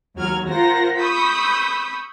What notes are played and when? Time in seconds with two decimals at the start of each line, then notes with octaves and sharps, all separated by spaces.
0.16 D#2 F#3 F#4 F6 G#6
0.48 F4 A#4 C5 F#5 A#6
0.99 B5 C#6 D#6 E6 G6 B6